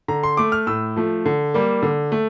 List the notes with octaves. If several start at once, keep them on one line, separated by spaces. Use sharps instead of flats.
D3 A#5
C6
A3 D6
F6
A2 E6
F3 A3
D3
G3 A#3
D3
A3